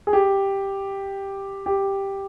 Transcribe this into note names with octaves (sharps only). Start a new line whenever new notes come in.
G#4
G4
G4